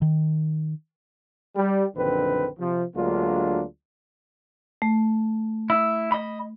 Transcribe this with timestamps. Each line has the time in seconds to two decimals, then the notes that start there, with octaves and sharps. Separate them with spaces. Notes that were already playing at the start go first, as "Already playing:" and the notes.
0.02 D#3
1.55 G3
1.96 A#1 F#2 D3 D#3 C4 B4
2.59 C3 F3
2.95 D2 F#3 G#3 A#3 D4 F4
4.82 A3
5.70 E4
6.12 D#5 B5